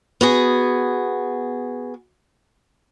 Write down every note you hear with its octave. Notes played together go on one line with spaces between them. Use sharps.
B3 F#4 G#4